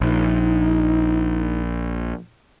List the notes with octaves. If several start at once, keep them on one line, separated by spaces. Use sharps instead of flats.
A#1 D#4